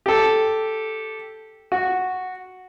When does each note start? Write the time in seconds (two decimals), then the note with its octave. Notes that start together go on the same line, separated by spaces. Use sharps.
0.06 G4 A4
1.72 F#4